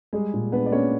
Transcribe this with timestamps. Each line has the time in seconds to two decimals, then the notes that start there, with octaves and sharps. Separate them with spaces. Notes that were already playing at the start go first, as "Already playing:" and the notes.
0.13 G3 G#3 G#4
0.34 A#2
0.52 B3 D4 B4
0.66 D5
0.72 A#3 C#4 C#5